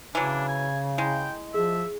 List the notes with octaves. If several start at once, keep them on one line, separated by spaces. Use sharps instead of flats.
C#3 E3 F#3 D4
G#5
G#3 E4 G5
F3 G#4 E5